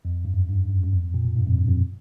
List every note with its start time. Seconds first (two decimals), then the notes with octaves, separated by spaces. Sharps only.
0.05 F2
0.25 G2
0.34 F#2
0.48 G2
0.70 F#2
0.84 F#2
0.92 F2
1.03 F2
1.14 A#2
1.25 B2
1.36 G2
1.47 F2
1.58 G2
1.68 F2